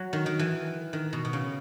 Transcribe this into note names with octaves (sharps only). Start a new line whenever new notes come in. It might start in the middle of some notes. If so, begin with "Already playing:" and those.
Already playing: F#3
D#3
D#3
E3
D#3
B2
B2
C#3